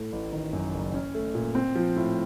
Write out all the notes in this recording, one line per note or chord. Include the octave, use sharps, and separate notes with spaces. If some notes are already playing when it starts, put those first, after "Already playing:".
Already playing: A2 A3
A1
D#3
F#2
F#1
C#4
A3
A#2
C4
F3
A2